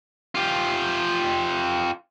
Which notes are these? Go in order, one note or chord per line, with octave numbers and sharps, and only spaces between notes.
F4 G4